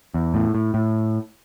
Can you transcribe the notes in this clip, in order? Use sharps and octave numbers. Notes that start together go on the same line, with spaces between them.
E2
A2
A2
A2